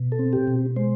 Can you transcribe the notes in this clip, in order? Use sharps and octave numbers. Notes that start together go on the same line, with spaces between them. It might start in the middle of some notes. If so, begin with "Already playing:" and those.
Already playing: B2
A4
C4
G4
B2
G#3 C5